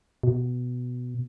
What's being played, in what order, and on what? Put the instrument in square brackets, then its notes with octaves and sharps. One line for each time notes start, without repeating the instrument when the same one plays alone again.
[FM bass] B2